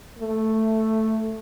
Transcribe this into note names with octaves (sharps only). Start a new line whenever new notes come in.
A3